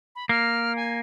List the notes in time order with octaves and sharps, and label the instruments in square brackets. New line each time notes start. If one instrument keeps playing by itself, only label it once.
[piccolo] B5
[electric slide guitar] A#3 [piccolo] F6
[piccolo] G#5